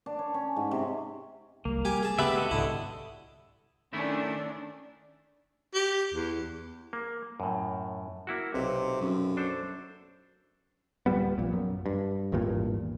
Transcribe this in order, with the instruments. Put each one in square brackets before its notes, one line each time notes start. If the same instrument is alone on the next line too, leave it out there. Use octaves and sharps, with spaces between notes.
[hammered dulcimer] D4
C#5
C#4
G#2
C3
[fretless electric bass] C2 G3 [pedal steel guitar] A#3
[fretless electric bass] G3 [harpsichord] G4 G#5
[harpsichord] G#4 A5
[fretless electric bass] C#3 G#3 [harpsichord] B3 G4 A5 [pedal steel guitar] B4 E5
[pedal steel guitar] F#4 A4 D#5
[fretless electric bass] C2 G#2 [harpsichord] D3 E4
[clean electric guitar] D#3 A3 E4 [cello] C#4 D4
[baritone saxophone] G4
E2
[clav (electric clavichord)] A#3
F#2 A2
A#3 E4 F#4
[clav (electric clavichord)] B1 [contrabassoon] C3
[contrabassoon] F#2
[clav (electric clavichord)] D4 A4 C5
[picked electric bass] D1 A#2 G3 B3
A#1 A#2
F#2
G2
G#1 E2 G2 A#2